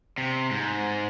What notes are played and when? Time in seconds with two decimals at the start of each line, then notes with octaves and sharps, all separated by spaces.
0.18 C3
0.51 G#2